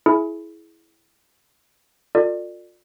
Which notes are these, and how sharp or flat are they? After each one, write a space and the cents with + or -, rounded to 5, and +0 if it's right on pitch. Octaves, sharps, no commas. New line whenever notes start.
E4 +0 G#4 +25
F4 +35 A4 +45 D5 +25